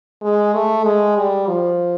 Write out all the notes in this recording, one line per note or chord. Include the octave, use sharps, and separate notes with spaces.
G#3
A3
G#3
G3
F3